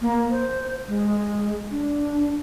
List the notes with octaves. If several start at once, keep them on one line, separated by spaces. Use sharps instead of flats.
A#3
C5
G#3
D4